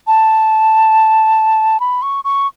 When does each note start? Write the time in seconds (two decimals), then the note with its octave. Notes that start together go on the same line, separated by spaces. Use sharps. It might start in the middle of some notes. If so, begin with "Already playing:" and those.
0.07 A5
1.80 B5
2.02 C#6
2.24 C#6